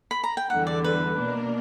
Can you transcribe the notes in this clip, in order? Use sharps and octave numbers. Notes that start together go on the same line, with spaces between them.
B5
A#5
G5
E2 D3 G3 F#5
D5
B4
B2 A#3 D4 A#4